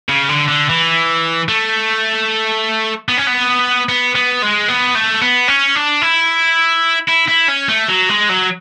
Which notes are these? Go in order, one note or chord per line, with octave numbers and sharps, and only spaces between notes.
C#3
D3
D3
E3
A3
B3
C#4
B3
B3
B3
G#3
B3
A3
B3
C#4
D4
E4
E4
E4
C#4
A3
F#3
G#3
F#3